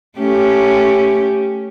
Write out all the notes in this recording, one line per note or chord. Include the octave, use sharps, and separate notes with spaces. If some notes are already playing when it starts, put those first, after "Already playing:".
A3 C#4 G4